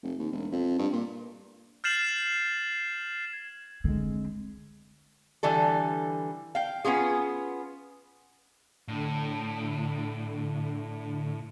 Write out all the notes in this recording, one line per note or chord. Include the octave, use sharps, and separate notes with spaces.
F1
D#2
E1
F2
G2
A#2
F6 G6 A6 C7 E7 F#7
G#6
D3 G#3 C4
D3 E3 G3 A4
F5 G5
B3 C#4 F4 G#4
A2 D3